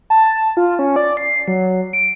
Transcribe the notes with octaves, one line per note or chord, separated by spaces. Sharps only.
A5
F4
C#4
D5
C7
F#3
D7